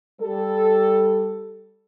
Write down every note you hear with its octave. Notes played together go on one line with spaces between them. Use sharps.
G3 A4